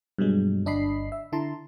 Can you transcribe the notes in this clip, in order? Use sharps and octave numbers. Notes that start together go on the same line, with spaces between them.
G2 B2 F#3 G#3
G1 D4 D#5 B5 C7
E5
D3 E4 A5 A#5 C6